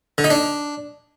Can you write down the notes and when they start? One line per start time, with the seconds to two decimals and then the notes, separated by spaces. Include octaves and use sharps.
0.18 D3
0.24 D#4
0.30 D4